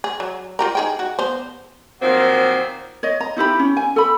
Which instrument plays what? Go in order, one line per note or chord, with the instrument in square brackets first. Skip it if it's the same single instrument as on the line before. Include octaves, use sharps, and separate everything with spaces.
[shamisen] G#4
F#3
F4 G4 A#4
D#4 G#4 G5
F#4
B3 C5
[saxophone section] A#2 D#3 F3 F#3 A#3 C4
[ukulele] C#5 D#5
A#5
D#4 E4 G4 B5
C#4
G#5
A4 B5